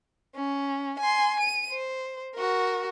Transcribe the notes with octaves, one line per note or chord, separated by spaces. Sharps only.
C#4
G#5 C6
D#7
C5
F#4 A#4